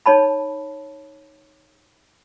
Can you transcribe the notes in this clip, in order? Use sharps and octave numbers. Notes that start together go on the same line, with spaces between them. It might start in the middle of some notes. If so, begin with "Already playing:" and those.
D#4 C#5 A5 B5